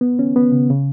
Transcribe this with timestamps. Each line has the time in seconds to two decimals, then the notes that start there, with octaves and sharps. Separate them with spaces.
0.01 B3
0.19 C#4
0.36 B3
0.52 C#3
0.70 C#3